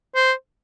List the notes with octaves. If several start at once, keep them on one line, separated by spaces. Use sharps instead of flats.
C5